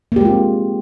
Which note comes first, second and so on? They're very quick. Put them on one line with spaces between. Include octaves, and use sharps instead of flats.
A#3 G4 G#3 F4 C4